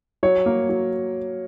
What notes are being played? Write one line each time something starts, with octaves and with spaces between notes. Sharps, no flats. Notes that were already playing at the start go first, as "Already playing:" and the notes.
F#3 C#5
A#3
F#3